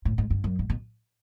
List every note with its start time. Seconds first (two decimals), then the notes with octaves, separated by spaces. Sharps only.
0.05 A2
0.18 G#2
0.30 G2
0.44 F#2
0.59 G#2
0.70 B2